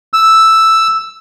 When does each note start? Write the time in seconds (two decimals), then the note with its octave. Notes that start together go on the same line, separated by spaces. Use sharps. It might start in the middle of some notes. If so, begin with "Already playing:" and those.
0.14 E6